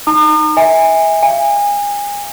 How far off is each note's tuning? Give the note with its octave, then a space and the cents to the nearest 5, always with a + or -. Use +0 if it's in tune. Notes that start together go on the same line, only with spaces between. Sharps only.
D#4 +0 A#5 -30 D#6 -45
E5 -30 G#5 -20
F5 -40 G#5 -30